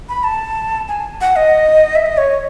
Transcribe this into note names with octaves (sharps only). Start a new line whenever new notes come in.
B5
A5
G#5
F#5
D#5
E5
D#5
C#5